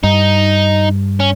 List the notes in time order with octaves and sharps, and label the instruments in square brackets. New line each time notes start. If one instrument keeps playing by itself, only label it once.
[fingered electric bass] G2 [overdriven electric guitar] D#4
[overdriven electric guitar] C#4